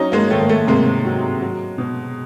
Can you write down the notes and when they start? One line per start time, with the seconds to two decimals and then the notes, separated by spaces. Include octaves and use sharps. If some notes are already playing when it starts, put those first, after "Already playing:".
Already playing: F#3 C#4 D#4
0.12 G#3 A#3
0.30 D#3 A3
0.41 A#3
0.49 A3
0.67 C3 G#3 A#3
1.05 F#3
1.41 F#3
1.78 B2